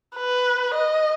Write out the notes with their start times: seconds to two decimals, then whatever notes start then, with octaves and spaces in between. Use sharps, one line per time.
0.16 B4
0.74 D#5